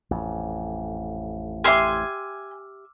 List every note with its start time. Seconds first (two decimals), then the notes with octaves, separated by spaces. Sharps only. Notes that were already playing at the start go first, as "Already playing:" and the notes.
0.11 A1 F2
1.64 G4 E5 G#5 C6 D6 E6 F6